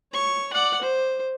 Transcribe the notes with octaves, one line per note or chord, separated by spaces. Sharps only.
C#5 C#6
D5 F#5
C5